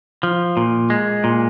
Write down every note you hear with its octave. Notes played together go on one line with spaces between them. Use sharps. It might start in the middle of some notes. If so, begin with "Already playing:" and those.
F3
A#2
G#3
A#2